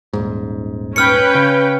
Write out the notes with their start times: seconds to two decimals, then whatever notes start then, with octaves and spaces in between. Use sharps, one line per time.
0.13 D#1 G#2
0.96 C#4 B4 G5 F6 C#7
1.35 C#3